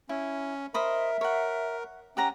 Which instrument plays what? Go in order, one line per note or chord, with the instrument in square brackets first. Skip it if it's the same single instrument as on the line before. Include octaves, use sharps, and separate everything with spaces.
[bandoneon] C#4 [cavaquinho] E4
[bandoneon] A#4 [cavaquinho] C5 D#5 B5 [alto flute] E5
[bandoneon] A#4 [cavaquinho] C#5 F#5
[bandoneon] C#4 [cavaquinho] G4 F#5 A#5